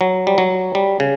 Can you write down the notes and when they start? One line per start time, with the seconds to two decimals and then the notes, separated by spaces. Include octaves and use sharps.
0.01 F#3
0.27 G3
0.38 F#3
0.75 G3
1.00 C#3